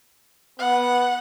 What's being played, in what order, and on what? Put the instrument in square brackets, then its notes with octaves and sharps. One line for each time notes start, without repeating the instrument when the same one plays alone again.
[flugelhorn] B3 [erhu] F#5